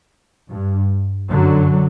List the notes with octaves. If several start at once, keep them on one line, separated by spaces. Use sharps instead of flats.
G2
F#2 D3 F#3